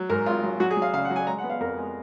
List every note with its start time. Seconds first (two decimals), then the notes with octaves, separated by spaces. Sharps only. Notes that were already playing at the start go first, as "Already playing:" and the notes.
Already playing: F#3
0.10 G#2 A#4
0.26 G#1 F4
0.44 F#3
0.60 F#3 F#4
0.71 G#4
0.77 F#3
0.82 F5
0.93 C#3 F5
1.05 F#5
1.10 F#3
1.16 G#5
1.27 G#3 A#5
1.38 F#5
1.44 B3
1.50 F5
1.60 F2 A#4
1.77 G#3